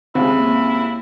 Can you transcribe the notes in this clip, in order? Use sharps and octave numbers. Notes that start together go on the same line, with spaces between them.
D#2 C#3 G#3 C4 E4
A#3